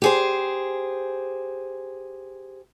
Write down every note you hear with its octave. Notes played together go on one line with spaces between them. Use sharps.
G4 G#4 C5